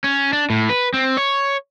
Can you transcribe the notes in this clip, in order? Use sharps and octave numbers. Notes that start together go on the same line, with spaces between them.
C#4
D4
A2
B4
C4
C#5